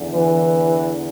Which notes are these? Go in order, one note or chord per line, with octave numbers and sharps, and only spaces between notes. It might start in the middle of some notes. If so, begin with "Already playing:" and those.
Already playing: E2 D3
E3